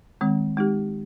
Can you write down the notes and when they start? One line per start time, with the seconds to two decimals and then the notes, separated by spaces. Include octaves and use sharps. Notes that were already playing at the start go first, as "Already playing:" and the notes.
0.21 D#3 G#3 C4
0.57 G#3 D#4 G4